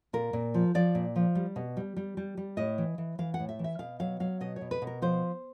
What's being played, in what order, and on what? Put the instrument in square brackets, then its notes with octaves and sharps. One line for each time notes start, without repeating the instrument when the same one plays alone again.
[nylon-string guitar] A#2 A#4
A#2
F3
F3 D5
A#2
F3
G3
B2
G3
G3
G3
G3
A2 D#5
E3
E3
E3 F5
F#5
A2
E5
E3
E5
B2 F5
F#3 F5
F#3 F5
B2 D#5
C#5
B2
B4
B2
A#4
F3 C5